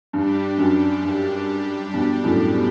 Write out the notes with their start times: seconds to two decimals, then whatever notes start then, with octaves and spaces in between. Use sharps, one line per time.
0.13 G2 G3 D4 G4
0.58 F#2
1.02 G2
1.93 G2 B2
2.24 F#2 A2
2.53 B2